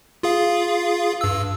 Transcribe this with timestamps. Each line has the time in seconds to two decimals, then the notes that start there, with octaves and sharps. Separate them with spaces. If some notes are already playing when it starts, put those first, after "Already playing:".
0.23 F4 G#4 F5
1.21 G2 E6